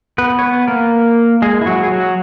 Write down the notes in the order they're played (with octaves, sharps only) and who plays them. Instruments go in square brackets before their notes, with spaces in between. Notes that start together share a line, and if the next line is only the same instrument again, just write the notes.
[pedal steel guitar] B3 B4
C#5
B3 B4
A#3 A#4
G#3 G#4
E4
F#3 F#4
G#4
F#3 F#4